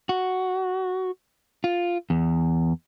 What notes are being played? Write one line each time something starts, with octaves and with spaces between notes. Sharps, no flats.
F#4
F4
E2